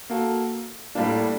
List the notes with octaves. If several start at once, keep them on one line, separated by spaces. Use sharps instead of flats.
A#3 F#4 A4
A2 G3 A#3 D4